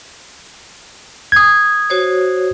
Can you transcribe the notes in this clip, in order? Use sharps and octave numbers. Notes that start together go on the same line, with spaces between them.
D#6 G#6
F#4 C5 C#5